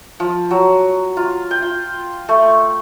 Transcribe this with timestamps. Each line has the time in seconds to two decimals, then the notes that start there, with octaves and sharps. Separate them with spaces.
0.20 F3
0.51 F#3
1.17 F4
1.51 G5
1.62 F4
2.29 A3